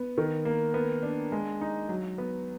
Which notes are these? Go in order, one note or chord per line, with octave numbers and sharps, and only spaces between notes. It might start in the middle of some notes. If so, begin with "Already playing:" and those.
Already playing: B3
D#3
A#3
B3
D4
G#3
D#4
F#3
B3